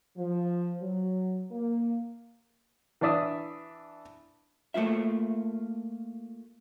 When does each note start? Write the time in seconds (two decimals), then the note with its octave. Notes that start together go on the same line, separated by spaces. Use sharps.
0.17 F3
0.82 F#3
1.52 A#3
3.01 E3 D4 D5 E5 D#6
4.74 A3 A#3 F4 E5